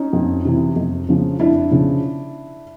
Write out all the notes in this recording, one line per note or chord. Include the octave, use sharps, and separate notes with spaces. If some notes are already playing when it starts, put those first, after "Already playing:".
Already playing: C#4 D#4
F2
C3 E3
F2
C#3 F3
F2 D4 E4
C#3 F3